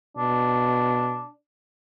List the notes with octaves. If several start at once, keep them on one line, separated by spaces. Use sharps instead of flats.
B2 D4